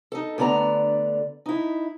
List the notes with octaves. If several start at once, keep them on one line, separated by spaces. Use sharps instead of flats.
D#4 A4
D2 D3 B3 D5 A#5
D#4 E4